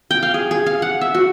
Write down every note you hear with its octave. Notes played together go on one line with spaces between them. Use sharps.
G5
F5
G#4
G#4
F5
F#5
E5
F#4